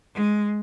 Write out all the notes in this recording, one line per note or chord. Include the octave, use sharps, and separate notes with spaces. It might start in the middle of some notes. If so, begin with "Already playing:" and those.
G#3